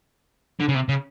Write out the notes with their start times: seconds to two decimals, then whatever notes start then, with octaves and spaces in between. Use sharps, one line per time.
0.60 D3
0.68 C#3
0.75 C3
0.89 C#3